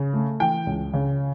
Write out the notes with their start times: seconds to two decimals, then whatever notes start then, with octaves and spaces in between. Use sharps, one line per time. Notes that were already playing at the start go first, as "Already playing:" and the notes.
Already playing: C#3
0.13 A3
0.40 E3 G5
0.67 C#2
0.93 C#3